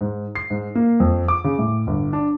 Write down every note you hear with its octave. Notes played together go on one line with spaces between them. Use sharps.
G#2
C7
G#2
A#3
F2
D6
C#3
A2
G1
D4